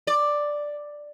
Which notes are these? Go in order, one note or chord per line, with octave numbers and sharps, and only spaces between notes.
D5